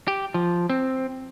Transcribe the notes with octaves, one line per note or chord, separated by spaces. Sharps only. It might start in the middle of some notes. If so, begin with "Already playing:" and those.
G4
F3
C4